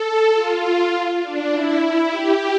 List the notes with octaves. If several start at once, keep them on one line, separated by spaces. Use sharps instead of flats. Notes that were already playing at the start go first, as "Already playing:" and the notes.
Already playing: A4
F4
D4
E4
E4
G4